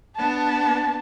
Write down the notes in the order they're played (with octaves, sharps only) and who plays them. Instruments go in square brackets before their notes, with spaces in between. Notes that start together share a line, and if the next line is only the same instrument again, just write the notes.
[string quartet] B3 D4 [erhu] A5